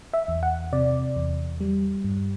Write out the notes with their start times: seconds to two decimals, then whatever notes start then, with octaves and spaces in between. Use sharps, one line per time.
0.14 E5
0.28 E2
0.43 F#5
0.73 C3 D5
1.16 E2
1.61 G3
2.04 G2